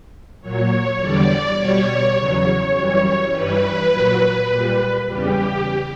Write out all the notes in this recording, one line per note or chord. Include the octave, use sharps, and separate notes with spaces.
A#2 F#3 C#5
E2 D3 G3 D5
B2 G3 C#5
E2 C#3 F#3
F#2 E3 G3
G2 E3 G3 B4
A#2 F#3
A#2 G3
E2 C#3 G3 G4